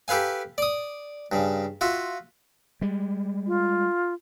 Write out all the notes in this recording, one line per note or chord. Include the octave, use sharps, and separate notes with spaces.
G4 A4 B4 F5 G#5
D5 D#6
G2 C#3
F4 F#4 E5
G3 G#3
F4